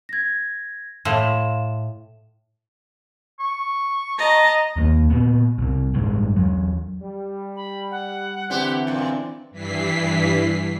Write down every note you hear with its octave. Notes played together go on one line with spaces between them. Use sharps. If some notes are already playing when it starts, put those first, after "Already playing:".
G#6 A#6
A2 F5 C6 E7
C#6
D#5 A5 A#5
D#2 G3 A#3
A#2 B3
C2 C3
A1 G2 G3 G#3
E2 F#3
G3
B5
F#5
D3 E3 C4 D4 E4 G4 C5
F#2 A#2
G2 E3 B6 C7